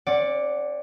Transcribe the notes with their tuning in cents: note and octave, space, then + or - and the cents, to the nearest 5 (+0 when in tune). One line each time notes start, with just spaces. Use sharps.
C#4 -40 D5 +0 F#5 +0